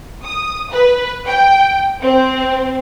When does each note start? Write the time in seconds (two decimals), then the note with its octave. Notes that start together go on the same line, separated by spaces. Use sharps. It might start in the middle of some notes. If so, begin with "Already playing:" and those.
0.24 D#6
0.71 B4
1.26 G5
2.03 C4